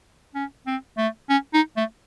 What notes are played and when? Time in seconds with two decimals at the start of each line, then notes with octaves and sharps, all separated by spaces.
0.35 C#4
0.67 C4
0.98 A3
1.30 C#4
1.54 D#4
1.77 A3